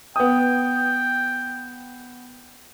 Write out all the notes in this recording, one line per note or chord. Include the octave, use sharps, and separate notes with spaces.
B3 G5 D#6